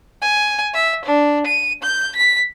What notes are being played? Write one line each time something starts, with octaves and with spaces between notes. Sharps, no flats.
G#5
E5
D4
D#7
G6
B6